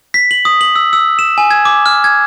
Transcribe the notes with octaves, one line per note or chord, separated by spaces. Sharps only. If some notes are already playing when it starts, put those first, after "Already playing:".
B6
F#7
D#6
F#7
E6
E6
E7
G#5
G#6
D6
F6
G#6